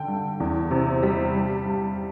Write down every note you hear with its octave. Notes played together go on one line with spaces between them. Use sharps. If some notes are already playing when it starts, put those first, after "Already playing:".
Already playing: D3 G5
G2
E2
C3
G3
G2
G2